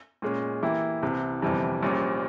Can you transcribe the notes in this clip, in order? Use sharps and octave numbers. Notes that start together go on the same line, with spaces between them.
A#2 G#3 C#4
E3 A#3 E4 G4
C2 C3 E3
G1 F2 C3 E3 G3
A#1 A#2 G3 C#4